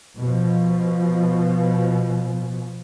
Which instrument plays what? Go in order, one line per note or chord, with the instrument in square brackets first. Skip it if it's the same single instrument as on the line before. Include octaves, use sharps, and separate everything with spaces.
[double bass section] B2 F3